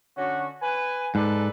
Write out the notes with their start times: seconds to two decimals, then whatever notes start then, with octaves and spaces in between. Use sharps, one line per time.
0.17 D3 C#4 F#4
0.62 B4 G#5
1.15 G#2 A4 B4 D5